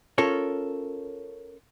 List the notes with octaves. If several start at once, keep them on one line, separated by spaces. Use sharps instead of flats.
C#4 F4 A4 A#4 C#5